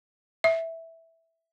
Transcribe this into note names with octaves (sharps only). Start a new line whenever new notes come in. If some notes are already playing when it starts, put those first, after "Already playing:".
E5